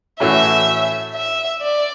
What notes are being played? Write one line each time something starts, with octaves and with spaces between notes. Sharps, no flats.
A2 E3 A3 C#4 F#4 E5
E5
D5